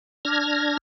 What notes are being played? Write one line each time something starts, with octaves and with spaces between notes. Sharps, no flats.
D4 F6 G#6 A#6